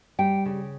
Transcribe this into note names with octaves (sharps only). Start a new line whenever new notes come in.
G3 G5
C#3